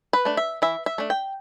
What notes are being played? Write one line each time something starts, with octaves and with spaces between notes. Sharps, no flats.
B4
A3 D4
E5
E3 E5
E5
A3 D4
G5